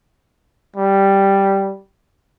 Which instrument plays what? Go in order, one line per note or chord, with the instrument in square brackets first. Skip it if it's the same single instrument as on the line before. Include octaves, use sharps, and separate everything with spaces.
[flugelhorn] G3